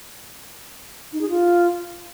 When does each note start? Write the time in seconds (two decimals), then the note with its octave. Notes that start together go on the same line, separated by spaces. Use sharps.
1.13 D#4
1.21 G#4
1.29 F4